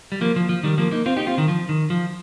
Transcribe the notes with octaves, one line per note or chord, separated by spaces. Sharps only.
G3
F3 A#3
F3
F3
D#3 G3
F3 A#3
A#3 D#4
C4 F4
D#4 G4
C4 F4
D#3
F3
D#3
F3